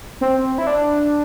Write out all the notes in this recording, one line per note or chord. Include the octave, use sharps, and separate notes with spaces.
C4
E4
D4